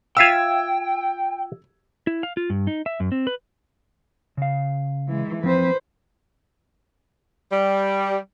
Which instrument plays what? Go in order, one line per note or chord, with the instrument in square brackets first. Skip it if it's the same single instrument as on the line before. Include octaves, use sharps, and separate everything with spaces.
[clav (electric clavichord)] F4 E5 F5 [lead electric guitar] G5 [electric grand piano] E6 G#6
[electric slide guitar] E4
F5
F4
G2
D#4
E5
F#2
C4
B4
C#3 F5
[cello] E3 G#3
[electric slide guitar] F3 C4 [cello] B4 C5
[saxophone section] G3